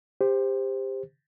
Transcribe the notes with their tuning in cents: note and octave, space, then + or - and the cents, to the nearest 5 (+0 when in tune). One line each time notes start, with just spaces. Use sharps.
G4 +25 C5 +0